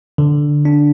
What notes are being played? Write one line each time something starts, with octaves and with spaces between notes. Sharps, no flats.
D3
D4